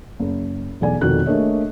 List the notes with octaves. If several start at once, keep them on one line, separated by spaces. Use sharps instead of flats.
F#1
B1 E2 D5 G#5
F1 F2 B2 D#3 F#4 F#6
A3 A#3 D4 G#4 C#5 D#5